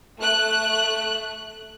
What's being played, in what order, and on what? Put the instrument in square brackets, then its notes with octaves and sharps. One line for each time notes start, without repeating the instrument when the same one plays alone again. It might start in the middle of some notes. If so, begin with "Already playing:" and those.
[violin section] A3 F#6